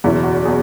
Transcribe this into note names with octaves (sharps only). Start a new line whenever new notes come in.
F#1 E2 B2 E4
F#4
B2 G#4